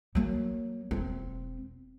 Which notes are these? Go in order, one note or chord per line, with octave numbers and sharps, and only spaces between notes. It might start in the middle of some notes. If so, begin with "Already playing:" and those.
F#3 A#3
E1 C4